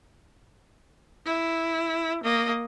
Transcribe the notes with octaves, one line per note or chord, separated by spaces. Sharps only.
E4
A#3 D#5